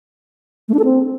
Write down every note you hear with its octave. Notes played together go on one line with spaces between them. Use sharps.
A3
D4
A4
C4